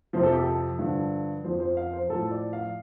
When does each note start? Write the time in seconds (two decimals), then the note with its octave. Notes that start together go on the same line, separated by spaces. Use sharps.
0.13 F2 C3 F3 C5
0.23 A4
0.32 G4
0.40 A4
0.79 G2 D3 F3
1.44 F2 F3 C5
1.60 C5
1.77 F5
1.93 C5
2.09 A2 F3 A4
2.31 D5
2.53 F5